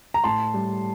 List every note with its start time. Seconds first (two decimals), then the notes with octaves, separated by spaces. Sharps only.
0.14 A#5
0.24 A2 A5 C6
0.54 G3